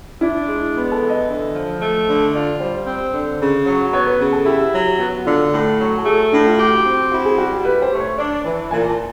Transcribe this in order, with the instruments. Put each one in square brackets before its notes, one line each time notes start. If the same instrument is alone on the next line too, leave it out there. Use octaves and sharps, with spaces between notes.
[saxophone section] D4 [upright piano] E4
[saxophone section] G#3
B3
[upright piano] A4
[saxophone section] E3
[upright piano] D#5
[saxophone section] D3
F3
A3
D3
[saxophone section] F4 [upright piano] D5
[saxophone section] G3 [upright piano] C5
[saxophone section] C4
D3
C#3
F#3
[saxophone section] B3 [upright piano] C#5
[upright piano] B4
[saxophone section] C#3
[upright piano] A4
[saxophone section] E4 [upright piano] G4
[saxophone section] F#3
[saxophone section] B3 [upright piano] F#4
[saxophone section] D3 [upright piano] F4
[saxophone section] A2
F#3
[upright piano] A4
[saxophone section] A3 [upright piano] G#4
[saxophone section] A2 [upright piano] D4
[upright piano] F4
[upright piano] F#4 [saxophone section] G4
[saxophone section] C4
[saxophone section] E4 [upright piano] F#4
[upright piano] G#4
[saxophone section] G3 [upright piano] F#4
[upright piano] G4
[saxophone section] G4 [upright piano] B4
[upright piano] C5
[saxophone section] A3
[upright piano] C#5
[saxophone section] D4 [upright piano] D5
[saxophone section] E3
[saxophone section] A#2 [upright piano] G#5
[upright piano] A5